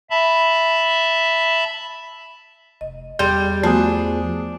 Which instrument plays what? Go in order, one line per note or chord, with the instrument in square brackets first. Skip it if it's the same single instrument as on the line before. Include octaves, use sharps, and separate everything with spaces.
[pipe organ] E5 A5 B5
[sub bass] F1 [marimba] D#5
[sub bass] E2 [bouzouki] G3 [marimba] G#4 C6 [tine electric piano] G6
[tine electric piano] F3 G#4 [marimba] A3 B3 F#4 [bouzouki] D4